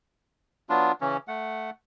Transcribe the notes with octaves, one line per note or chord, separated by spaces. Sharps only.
F#3 B3 D4 F4
C#3 E3 C#4
A3 F#5